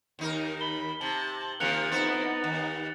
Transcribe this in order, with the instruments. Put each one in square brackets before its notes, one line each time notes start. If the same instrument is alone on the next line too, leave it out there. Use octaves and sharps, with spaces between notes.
[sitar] D#2 D#4 A#4
[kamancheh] B5 [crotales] G7
[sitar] C3 [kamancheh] A5 [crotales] F#7
[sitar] C3 D#3 F3 [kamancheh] A#3 [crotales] F#6 C#7 F7
[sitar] F2 E4 C5 [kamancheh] B3 D#4 [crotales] A6 C#7
[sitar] D#2